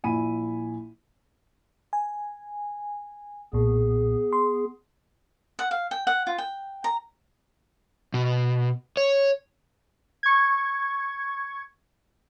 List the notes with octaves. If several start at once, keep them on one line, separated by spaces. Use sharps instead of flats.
A#1 E4 G#5 B5 D#7
G#5
B1 A#2 B3 G#4
C6
F#5
F5
G5
F#5
F4
G5
A#5
B2
C#5
C#6 G#6